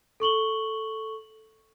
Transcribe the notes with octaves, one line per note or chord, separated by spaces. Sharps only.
A4 C#6 F#7 G7